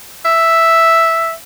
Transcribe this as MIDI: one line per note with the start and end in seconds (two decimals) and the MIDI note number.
0.25 1.32 76